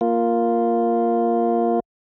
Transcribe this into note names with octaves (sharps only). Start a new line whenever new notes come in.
A#3 F4